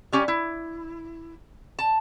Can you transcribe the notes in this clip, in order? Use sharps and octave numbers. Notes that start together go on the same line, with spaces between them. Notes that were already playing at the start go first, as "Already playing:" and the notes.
G3 C#4 G4 G#5
E4
A5